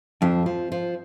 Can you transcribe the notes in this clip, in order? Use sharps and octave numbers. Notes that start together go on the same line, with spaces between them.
F2 F3
F3
F3